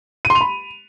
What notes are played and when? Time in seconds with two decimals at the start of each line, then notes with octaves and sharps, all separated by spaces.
0.25 D#7
0.30 C6
0.35 F7
0.41 B5